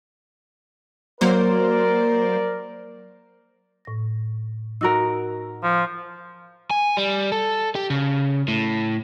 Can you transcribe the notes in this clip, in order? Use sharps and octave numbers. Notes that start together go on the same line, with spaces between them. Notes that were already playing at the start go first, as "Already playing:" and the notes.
F#3 A#3 A#4 C5 D5
A2 A#6
D#4 F#4 A#4 E6
F3
G#5
G3
A4
G4
C#3
A2